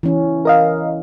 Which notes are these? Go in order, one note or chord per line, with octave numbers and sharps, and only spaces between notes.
E3 C#4
A#4 D#5 F5